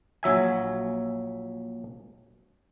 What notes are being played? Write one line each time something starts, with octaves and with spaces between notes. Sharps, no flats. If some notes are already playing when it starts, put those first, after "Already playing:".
A#1 F#3 E5 G#5